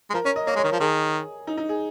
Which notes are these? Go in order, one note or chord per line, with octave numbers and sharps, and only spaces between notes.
G#3
F3 A#4
C#4 C#5
D#5
A#3 C#5
G#3
C#5
D#3 A#4
F3
D#3 G#4
D#4
D#4
G#4